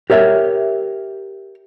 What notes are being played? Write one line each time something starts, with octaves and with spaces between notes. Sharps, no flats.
G4 A#4 C#5 E5